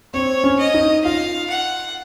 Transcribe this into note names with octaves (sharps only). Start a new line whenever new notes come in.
C4 C#5
C#4
D#5
D#4
F4 F5
F#5